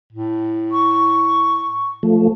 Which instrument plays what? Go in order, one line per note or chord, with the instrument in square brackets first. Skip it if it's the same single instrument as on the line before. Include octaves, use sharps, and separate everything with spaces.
[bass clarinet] A2
[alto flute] C#6
[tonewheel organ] F3 A3